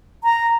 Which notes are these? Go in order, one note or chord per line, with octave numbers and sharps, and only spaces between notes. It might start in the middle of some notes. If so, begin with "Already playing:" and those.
A#5